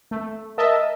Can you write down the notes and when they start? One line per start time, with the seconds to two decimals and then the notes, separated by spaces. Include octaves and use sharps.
0.11 A3
0.58 A#4 D#5 E5 A5